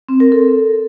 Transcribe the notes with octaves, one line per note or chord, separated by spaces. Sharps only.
C4
A#4
A4